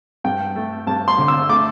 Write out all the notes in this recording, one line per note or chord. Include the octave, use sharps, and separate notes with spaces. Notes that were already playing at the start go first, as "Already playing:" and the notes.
G2 G5
A3
G2 A5
C6
D3
E6
A3 D6